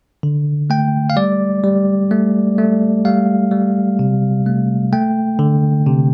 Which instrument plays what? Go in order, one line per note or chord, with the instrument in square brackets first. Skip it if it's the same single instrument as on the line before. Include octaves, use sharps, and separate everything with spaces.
[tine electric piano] D3
A3 G5
F5
G3 D5
G3
A3
A3
G3 F5
G3
C3
A3
A3 G5
D3
C3